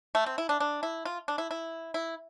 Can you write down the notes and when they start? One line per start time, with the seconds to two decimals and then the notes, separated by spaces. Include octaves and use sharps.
0.15 A3
0.26 C4
0.38 E4
0.49 D4
0.60 D4
0.83 E4
1.05 F4
1.28 D4
1.38 E4
1.51 E4
1.94 E4